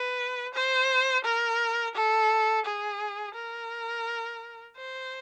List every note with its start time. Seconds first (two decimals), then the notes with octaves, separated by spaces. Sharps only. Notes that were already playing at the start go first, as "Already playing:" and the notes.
Already playing: B4
0.54 C5
1.25 A#4
1.95 A4
2.65 G#4
3.35 A#4
4.76 C5